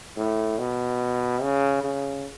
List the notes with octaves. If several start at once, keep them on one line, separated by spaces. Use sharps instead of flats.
A2
B2
C#3
C#3